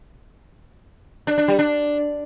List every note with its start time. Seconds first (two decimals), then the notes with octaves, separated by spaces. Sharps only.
1.27 D4
1.38 D4
1.48 G3
1.59 D4